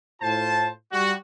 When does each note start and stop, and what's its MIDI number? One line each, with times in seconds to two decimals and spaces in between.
0.21 0.68 45
0.21 0.68 65
0.21 0.68 72
0.21 0.68 81
0.92 1.13 55
0.92 1.13 66